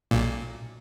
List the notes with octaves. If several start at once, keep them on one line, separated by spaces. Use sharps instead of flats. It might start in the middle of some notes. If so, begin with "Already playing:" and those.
B1 A#2